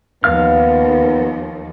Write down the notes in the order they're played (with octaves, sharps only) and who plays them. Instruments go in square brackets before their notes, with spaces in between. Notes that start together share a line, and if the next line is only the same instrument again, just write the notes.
[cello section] D#2 F3 [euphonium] B3 [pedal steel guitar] F5 F6